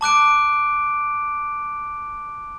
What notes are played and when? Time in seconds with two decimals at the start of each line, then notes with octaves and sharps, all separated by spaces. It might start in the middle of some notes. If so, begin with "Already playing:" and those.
0.01 A5 D6 F#6 D7